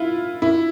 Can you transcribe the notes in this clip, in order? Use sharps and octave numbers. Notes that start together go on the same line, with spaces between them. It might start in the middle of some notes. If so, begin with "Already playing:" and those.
Already playing: E4 F4
E4